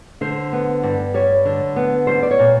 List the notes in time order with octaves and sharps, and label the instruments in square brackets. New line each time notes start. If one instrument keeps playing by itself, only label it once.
[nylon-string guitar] D3 C5
B3
G2
G3 C#5
D3
B3
G3 C5
D5
C#5
A#2